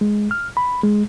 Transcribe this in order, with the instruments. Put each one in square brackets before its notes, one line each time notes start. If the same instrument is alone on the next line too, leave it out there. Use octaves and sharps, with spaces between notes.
[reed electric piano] G#3
F6
B5
G#3